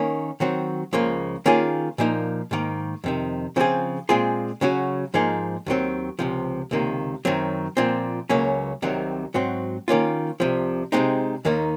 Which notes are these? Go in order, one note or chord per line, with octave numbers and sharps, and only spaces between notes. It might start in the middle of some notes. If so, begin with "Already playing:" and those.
Already playing: D#3 A#3 C#4
D#3 F#3 C4 F#4
C#2 C#3 F3 A#3
D#3 A#3 C#4 F4 G#4
A#2 F3 A#3 D#4
G#2 D#3 A#3
F2 C3 D#3
C#3 F3 C4 F4 G#4
A#2 G#3 C4 F4 G#4
C#3 F#3 C#4 F#4
G#2 F3 A#3 D#4 G#4
D#2 D#3 F#3 C4
C#2 C3 F3
C#2 C3 D#3 A#3
F#2 D#3 F#3 C4
A#2 F3 C4
C#2 C#3 F#3 A#3 C#4
C2 C3 D#3 F#3 C4
G#2 F#3 C4 F#4
D#3 A#3 C#4 F4
C2 C3 F3
C3 D#3 G#3 C4 D#4
D#2 D#3 A#3 D#4